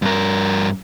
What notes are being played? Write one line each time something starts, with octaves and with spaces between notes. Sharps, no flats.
G2 A#4